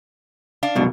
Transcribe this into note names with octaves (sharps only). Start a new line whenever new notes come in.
D4 F5
C2 F#2 B2